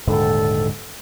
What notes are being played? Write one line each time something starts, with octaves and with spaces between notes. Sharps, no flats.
D#1 G#2 D3 A4